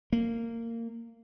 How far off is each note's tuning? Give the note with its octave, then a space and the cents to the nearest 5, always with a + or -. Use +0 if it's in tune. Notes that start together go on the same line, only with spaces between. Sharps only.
A#3 -20